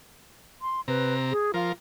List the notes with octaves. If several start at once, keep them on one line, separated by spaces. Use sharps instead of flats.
C6
C3 B4 A#5
G#4
F3 F4 A#4